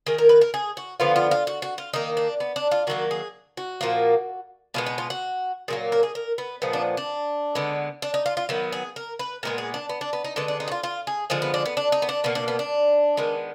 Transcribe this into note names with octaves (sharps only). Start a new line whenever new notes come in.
D#3 A#3 G#4
A#4
B4
A#4
G#4
F#4
D3 F3 B3 F4
F4
F4
F#4
F#4
F4
D#3 A#3 D#4
D4
B3
D4
F4
D#3 F#3 A#3 F#4
G#4
F#4
A#2 F3 A#3
B2 G#3 B3 F4
D#4
F4
F#4
A#2 F#3 A#3 G#4
A#4
G#4
A#4
B3
A#2 F3 G#3 B3
D4
D4
D3 G#3 B3
D4
D#4
F4
F4
D#3 F#3 B3
G#4
A#4
B4
A#2 G#3 B3 A#4
G#4
D4
B3
D4
B3
D#4
D3 G#3 B3 D4
D4
D#4
F#4
F4
F4
G#4
D3 F3 G#3 G#4
B3
D4
B3
D4
D#4
B3
D4
B2 A#3 B3
D4
B3
D4
D#3 G#3 B3